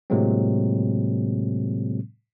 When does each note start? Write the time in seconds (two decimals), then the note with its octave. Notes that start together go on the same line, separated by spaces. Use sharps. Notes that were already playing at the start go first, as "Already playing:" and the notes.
0.10 A2 C3 F#3 G#3 A#3 C4